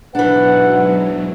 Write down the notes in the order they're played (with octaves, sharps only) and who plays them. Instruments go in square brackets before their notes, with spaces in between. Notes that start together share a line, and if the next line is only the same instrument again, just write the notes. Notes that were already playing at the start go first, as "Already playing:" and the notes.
[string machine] G#2 B2 F#3 [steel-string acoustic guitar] E3 D4 [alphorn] B4 [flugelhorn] F#5